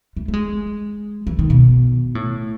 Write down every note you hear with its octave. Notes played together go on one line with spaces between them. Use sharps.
A3
A3
G#3
E3
D#3
B2
A2